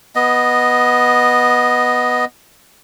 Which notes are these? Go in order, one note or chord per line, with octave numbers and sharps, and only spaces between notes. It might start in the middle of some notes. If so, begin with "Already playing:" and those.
B3 D#5